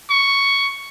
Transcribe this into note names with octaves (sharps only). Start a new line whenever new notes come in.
C#6